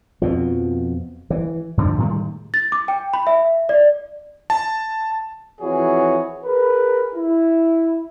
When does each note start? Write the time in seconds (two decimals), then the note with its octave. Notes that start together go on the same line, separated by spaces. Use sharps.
0.22 F2 B2 F3
1.30 E3
1.77 G2 D3 E3 F3
1.98 A2 D#3 G3 G#3
2.54 A6
2.72 D6
2.88 G5
3.13 B5
3.27 E5
3.69 D5
4.50 A5
5.61 F2 E3 F#4 G#4 C#5
6.44 G#4 A#4 B4
7.14 E4